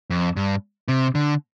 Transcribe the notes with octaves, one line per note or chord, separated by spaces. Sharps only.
F2
G2
C3
D3